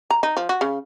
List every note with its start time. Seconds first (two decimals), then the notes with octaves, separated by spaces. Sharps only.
0.10 A#5
0.23 D#4
0.37 F3
0.49 F#4
0.61 C#3